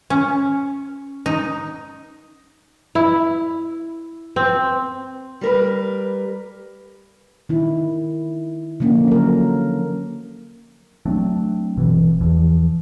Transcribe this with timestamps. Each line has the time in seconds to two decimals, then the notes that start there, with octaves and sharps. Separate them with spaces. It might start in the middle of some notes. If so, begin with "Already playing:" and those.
0.10 C#4
1.26 D#4
2.95 E4
4.36 C4
5.41 G3 A#4 B4
7.49 D#3 E4
8.80 D3 F3 A#3 C#4
9.08 F#3 A#4
11.06 F#3 A3 C4 D4
11.76 G1 B2 E3
12.20 E2 E3 F3